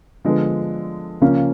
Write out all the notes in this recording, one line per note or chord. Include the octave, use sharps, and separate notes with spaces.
D3 F3 G#3 B3
C#3 F3 A#3 C#4